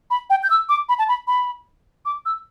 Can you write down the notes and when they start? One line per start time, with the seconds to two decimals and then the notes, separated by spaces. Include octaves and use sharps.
0.10 B5
0.30 G5
0.43 G6
0.50 E6
0.69 D6
0.89 B5
0.99 A5
1.08 B5
1.27 B5
2.05 D6
2.26 E6